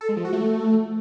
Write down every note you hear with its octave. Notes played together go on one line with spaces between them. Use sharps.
A4
G#3
F3
F#4
A3